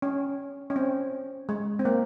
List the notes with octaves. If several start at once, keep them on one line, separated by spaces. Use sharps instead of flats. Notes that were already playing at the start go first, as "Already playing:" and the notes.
C#4
C#4
C4
G#3
C4
A#3